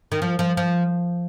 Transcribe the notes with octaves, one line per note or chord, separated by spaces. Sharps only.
D#3
F3
F3
F3